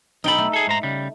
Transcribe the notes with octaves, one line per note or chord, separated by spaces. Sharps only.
B1 D#4 A4 G5 B5
A3
G#4 A4
G#2 C5 A#5
C#3 G3